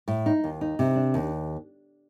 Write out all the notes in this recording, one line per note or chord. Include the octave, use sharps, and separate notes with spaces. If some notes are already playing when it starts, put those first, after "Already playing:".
A2
D#4
D#2
D#4
C3
D4
D#2